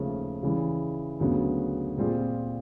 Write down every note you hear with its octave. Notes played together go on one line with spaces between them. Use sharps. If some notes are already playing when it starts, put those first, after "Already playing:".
Already playing: D#2 C#3 F3 A3
C#3 E3 G3
D2 C#3 F#3 B3
A#2 G3 C4 F4 G#4